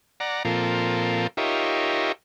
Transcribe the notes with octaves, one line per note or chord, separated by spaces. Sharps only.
D5 F#5 A#5
A#2 F3 C4 F4 A4 A#4
D#4 F4 G4 A#4 C#5 E5